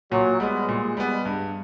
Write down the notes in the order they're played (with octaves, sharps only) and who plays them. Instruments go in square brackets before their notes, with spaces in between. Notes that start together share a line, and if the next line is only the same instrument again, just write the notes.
[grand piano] A#2 [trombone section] F#3
[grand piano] G3 B3 [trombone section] G#3
[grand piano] A#2
G3 B3
G2